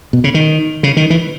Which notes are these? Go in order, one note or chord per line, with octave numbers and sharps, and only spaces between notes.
B2
C#3
D#3
C#3
D#3
E3